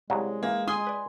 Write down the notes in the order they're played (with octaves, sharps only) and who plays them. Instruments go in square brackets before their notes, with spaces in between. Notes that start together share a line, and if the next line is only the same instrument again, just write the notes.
[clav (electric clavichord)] C2 C#3 F#3 [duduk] G#3
[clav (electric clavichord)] E3 [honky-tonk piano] A#3
[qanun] G#5 C6 [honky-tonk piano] D#6
[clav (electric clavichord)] B4 D5